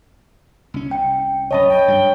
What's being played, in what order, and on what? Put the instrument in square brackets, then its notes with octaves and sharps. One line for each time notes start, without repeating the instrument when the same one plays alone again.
[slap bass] C2 C#4
[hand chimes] G5
[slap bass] C2 F#2 [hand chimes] C#5 A5 B5 [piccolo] D#5
[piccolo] G5
[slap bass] G2 G3